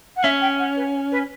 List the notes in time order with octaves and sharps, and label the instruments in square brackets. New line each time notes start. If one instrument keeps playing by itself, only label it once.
[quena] F#5
[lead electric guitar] C#4 [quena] E5
[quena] G5
F#5
B4
B4